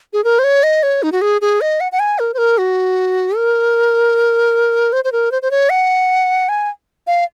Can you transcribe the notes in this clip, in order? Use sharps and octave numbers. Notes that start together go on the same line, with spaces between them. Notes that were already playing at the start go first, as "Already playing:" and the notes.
G#4
A#4
C5
C#5
D#5
C#5
D#4
F#4
G#4
G#4
D#5
F#5
F#5
G#5
A#4
C5
A#4
F#4
A#4
C5
C5
A#4
C5
C5
C#5
F#5
G#5
F5